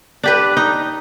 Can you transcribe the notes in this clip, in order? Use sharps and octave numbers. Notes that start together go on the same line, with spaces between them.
D4 G4 B4
D#4